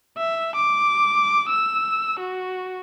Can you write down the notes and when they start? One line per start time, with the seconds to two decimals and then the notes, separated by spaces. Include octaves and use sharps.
0.18 E5
0.55 D6
1.49 E6
2.19 F#4